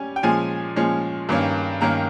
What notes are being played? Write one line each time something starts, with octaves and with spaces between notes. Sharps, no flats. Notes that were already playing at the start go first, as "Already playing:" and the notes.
Already playing: G3 C#4 G#5
G5
A#2 F3 G#3 C#4 G#5
A#2 F3 G#3 C#4
G2 D#3 A#3 C#4
G2 D#3 A#3 C#4 A#5